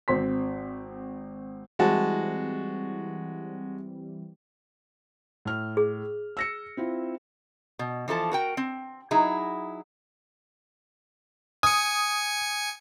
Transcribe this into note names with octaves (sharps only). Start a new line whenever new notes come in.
G#1 C4 C6 B6
E3 G3 G#3 C4 F#4 A5
A2 F6
G#4
E6 A#6 C#7
C4 E4 F4
B2
E3 F3 A4 A5
F#4 A#4 G5
C4
F#3 D#4 E4 G#4
G#5 D#6 C#7